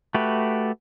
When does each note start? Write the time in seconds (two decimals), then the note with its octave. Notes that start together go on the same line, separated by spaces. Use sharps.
0.15 A3 F#4 G4 B4